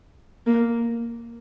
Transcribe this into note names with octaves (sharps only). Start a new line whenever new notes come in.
A#3